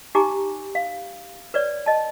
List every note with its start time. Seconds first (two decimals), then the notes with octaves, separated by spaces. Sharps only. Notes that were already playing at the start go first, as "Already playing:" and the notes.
0.15 D#4 G4 G#5 A#5 D6
0.75 F5
1.54 B4 C#5 D5
1.86 D#5 A5